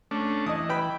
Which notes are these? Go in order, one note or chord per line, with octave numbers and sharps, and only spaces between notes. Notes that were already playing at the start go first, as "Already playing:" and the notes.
A3 C#4 D4
E3 D#5 A5 D#6
B4 G5 B5